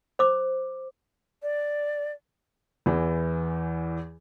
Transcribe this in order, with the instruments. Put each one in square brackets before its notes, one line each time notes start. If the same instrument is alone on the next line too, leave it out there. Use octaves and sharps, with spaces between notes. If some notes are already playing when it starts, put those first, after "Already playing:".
[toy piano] C5 D6
[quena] D5
[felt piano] E2 E3